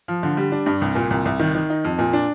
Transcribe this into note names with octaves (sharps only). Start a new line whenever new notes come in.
F3
D3
G3
D4
G2
C2
A#2
C2
C2
D#3
D#3
D#4
F2
A#2
D4